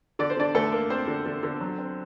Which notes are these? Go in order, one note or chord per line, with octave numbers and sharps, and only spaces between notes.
D3 D5
C5
D3 D4 D5
D3 A3 A4
A#3
A#3 C4 C5
D3
D3
D3
F#3
C4